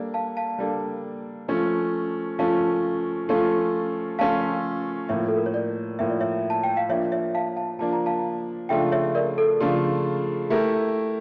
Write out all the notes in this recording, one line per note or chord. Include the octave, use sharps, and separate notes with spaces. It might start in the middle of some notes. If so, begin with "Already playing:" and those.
Already playing: G3 A#3 D4 A4
F5 A5
F5 A5
G3 A#3 D4 A4
F3 A3 C#4
F3 A3 C#4 F5 A5
F3 A3 C#4 F4 A4
F3 A3 C#4 F4 A4 F5 A5
A2 F3 A#3 C#5 E5
A4
A#4
C#5
A#4 D5
A2 F3 A#3 E5
D5
C#5 E5
A5
G5
F5
F3 A#3 D4 C#5 E5
C#5 E5
F5 A5
F5 A5
F3 A#3 D4 A5
A#5
F5 A5
C#3 F3 A3 D4 F4 E5 G5
C#5 E5
A#4 D5
A4
C#3 F3 A3 D4 F4
A3 E4 G4 A#4